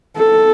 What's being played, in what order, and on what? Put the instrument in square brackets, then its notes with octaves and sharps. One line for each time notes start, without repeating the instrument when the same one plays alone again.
[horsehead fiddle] A4